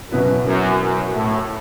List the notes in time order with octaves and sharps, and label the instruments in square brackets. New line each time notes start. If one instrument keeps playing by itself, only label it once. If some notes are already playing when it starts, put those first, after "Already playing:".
[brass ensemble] F#2 [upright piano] B2 B3 E4 B4
[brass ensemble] F#2
F#2
A2